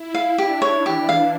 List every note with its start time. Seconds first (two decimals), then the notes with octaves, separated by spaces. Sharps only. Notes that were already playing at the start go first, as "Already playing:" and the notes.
Already playing: E4
0.14 F5
0.38 D4 G4
0.62 C#5
0.86 E3 G4
1.09 F5